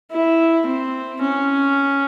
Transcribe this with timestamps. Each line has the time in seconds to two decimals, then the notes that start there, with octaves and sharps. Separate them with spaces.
0.12 E4
0.66 C4
1.22 C#4